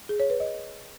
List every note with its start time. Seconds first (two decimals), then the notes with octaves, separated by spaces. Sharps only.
0.09 G#4
0.20 C#5
0.30 B4
0.40 D#5